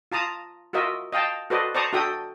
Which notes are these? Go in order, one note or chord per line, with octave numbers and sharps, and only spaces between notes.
F4 A5 A#5 D#6
F4 F#4 A#4 D#5 E5
D#5 F5 G5 A5
F#4 A4 B4 C5 D5 D#5
C5 D5 A5 A#5 C#6 D#6
D4 F#4 A4 E5 G5 D#6